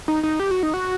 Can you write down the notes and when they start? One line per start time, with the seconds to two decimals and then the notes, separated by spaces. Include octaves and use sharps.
0.08 D#4
0.23 D#4
0.40 G4
0.51 F#4
0.63 D#4
0.74 F#4